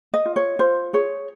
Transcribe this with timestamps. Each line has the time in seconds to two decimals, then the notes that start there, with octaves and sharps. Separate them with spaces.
0.14 D#5
0.26 F4
0.36 C#5
0.59 F4 C5
0.93 G#4 C#5